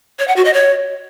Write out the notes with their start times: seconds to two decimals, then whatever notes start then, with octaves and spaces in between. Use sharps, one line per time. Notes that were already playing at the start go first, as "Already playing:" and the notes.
0.19 C#5
0.28 F#5
0.36 F#4
0.45 D#5
0.53 C#5